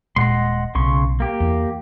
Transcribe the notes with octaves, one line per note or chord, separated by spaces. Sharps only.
D#1 A#2 G#3 D#5 F#5 C6
B1 C#3 C6 C#6
A#3 G4
E2